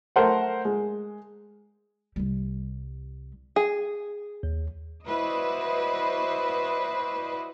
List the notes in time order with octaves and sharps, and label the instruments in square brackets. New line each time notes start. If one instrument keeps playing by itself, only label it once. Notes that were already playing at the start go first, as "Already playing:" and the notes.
[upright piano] A3 A#4 C5 F#5
G#3
[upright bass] C2 G3
[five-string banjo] G#4
[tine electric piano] D#2
[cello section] E4 F#4 B4 C5 D5 D#5